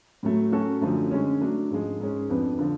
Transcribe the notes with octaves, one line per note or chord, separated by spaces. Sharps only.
A2 F#3 A3
F#3 C#4 F#4 A4
F#2 D3 F3 A3
D3 G#3 C#4
F#3 A3 D4
G#2 F3 G#3
G#2 G#3 C#4 G#4
F2 F3 B3 D4
D3 F3